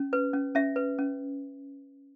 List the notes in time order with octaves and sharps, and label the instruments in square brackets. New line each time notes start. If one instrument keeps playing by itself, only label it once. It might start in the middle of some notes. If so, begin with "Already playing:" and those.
Already playing: [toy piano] C#4
B4
C#4
C#4 E5
B4
C#4